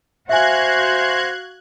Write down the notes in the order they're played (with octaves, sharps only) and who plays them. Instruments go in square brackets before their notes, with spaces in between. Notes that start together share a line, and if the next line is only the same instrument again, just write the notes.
[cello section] F#4 F5 [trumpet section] C5 [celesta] E5 G#5 [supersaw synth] F#6 G#6